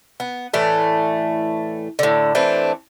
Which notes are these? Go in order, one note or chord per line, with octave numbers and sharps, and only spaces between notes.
B3
A2 E3 A3 D5
A2 D3
E3 A3 C4 D4